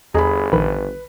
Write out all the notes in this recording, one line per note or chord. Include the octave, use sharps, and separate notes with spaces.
G1 E2 G#4 D#5 A#5 B5
A#1 D#3 B4 B5